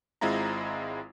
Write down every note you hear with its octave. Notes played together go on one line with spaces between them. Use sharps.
G#1 G#3 C4 E4 F4 A#5